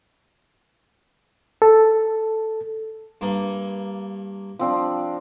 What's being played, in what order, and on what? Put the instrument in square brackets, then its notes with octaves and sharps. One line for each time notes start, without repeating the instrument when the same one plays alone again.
[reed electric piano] A4
[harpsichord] G2 A#3
[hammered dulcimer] F3 C4 D4